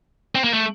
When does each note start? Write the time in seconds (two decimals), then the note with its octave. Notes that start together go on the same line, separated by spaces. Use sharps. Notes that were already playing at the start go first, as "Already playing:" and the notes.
0.35 C4
0.44 A#3
0.54 A3